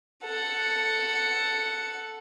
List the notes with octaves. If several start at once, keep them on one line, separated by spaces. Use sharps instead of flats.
A4 F#5